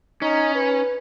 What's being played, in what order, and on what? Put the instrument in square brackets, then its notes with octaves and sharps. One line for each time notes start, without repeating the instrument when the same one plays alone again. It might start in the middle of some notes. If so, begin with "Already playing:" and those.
[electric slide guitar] C#4 [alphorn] D#4
[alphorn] B4